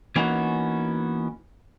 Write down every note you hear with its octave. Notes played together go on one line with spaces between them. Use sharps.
E3 A#3 B3 C#4 D#4 F#4